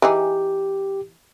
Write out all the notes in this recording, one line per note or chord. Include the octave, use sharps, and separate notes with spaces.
E3 D#4 G4 G#4